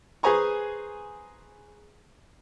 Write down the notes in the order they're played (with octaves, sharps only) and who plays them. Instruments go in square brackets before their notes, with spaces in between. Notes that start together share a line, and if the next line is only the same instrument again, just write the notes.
[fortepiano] G#4 B4 C5 G#5 A#5 C#6